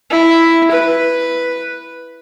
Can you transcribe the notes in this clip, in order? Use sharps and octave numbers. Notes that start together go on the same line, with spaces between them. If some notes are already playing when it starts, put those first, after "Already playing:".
E4
B4